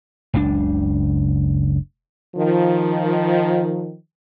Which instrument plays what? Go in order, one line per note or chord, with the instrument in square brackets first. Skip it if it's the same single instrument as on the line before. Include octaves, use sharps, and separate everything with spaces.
[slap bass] F#1 C#2 C#3 D4
[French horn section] D#3 F3